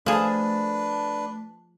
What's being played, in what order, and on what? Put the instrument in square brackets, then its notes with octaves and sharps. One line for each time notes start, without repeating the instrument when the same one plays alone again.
[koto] F3 G#4 [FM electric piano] A3 A5 [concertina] D4 B4